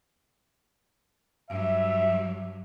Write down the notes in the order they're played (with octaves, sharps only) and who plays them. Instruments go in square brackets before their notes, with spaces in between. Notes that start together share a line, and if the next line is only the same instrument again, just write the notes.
[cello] G2 F#3 [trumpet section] E5